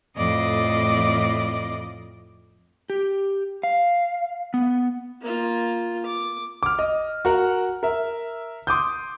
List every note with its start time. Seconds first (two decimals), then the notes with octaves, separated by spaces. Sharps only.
0.16 F2 A2 D5 D#5
2.90 G4
3.63 F5
4.54 B3
5.21 A#3 F4
6.06 D6
6.63 D6 F6
6.79 D#5
7.25 F#4 A#4 F#5
7.83 A#4 E5
8.67 C6 D6 D#6 G6